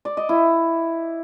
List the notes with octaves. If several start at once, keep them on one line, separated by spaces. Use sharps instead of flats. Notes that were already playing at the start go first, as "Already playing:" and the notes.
D5
D#5
E4